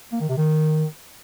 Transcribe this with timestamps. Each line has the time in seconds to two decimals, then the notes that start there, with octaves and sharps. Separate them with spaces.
0.12 A#3
0.21 D#3
0.29 C3
0.37 D#3